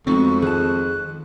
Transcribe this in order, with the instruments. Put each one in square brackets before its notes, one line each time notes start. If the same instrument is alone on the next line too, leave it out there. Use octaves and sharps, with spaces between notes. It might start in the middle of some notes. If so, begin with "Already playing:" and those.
[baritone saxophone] F2 [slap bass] G#3 A3 B3 [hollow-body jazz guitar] C4 D#4 F#4 [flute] C#6
[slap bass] D#3 [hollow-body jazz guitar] G#4 F#5 A5 [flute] F#6